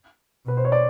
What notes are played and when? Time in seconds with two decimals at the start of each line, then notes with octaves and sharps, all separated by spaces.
0.45 B2 B4
0.57 C5
0.65 C#5
0.72 D5